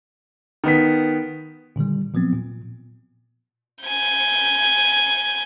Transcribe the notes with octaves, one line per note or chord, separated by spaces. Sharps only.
D#3 B3 B6
A#2 D3 D#3 G3
A#2 F3 F#3 B3 C4
A#2
G#5 G6